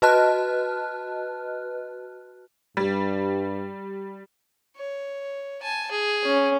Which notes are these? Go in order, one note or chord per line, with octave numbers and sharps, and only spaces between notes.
F#4 B4 D#5 A5 F6 F#6
G2 G3
C#5
G#5 A5
G#4
C#4